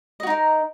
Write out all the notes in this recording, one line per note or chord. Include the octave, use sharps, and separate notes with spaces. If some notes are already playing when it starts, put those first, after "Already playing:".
D#4 F#4 A#4 D#5